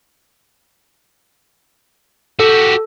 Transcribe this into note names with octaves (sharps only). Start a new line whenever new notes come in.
F#4 G4 A4